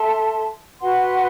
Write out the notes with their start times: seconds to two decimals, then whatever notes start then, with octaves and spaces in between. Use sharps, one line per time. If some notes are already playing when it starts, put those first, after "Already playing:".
Already playing: A4 E5 A5 C6
0.80 F#4 B4 F#5 C6